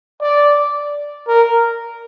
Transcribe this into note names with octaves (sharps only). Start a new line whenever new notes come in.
D5
A#4